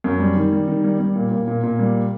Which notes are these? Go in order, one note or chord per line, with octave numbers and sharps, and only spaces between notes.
F#2
G3
D#3
G3
D#3
G3
G3
A#2
A#2
A#2
A#2
G3